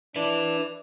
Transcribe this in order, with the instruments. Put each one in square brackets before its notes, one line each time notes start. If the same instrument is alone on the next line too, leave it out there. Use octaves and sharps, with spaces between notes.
[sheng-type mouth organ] D4 [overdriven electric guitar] B4 E5